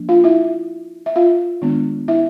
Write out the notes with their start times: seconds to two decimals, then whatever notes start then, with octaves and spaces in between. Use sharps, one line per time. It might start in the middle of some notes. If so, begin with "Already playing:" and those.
Already playing: F3 A#3 D4
0.09 F4 F5
0.24 E4 E5
1.06 E5
1.16 F4 F5
1.62 D#3 G#3 B3 D4
2.08 E4 E5